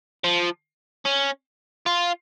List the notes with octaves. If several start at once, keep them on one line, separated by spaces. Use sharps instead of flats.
F3
C#4
F4